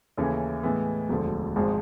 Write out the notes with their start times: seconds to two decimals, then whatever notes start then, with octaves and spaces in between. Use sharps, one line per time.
0.17 D#2 C#3 E3 A3 C#4
0.63 A2 E3 G#3 B3
1.09 E1 D2 D3 F3
1.56 G#1 G#2 F3 G#3